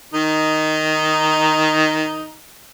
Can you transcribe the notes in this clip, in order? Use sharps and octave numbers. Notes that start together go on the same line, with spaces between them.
D#3 D#4